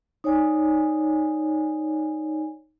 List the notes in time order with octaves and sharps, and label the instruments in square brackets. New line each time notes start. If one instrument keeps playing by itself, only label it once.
[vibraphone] D#4 C#5 D5 G#5